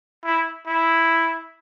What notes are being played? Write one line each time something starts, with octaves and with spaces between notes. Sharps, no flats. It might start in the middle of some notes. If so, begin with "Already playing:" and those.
E4
E4